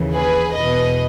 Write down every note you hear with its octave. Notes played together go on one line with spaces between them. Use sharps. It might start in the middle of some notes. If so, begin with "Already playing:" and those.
Already playing: D#2 C#3 E3
G#4 B4
E2 B2 B4 D#5